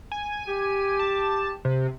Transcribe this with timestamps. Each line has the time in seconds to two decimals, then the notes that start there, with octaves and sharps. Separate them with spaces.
0.12 G#5
0.48 G4
0.99 A5
1.65 C3